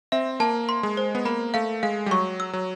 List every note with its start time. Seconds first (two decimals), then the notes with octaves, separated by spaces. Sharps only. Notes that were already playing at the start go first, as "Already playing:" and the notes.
0.12 C4 E5
0.40 A#3 A5
0.69 C6
0.83 G#3
0.97 C5
1.15 B3
1.25 A#3 B5
1.54 A3 F5
1.83 G#3 F5
2.06 G3
2.11 F#3 C#6
2.40 E6
2.53 F#3